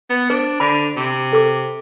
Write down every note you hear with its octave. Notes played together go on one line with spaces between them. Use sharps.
B3
D4 C5
D3 B5
C3
A4 D6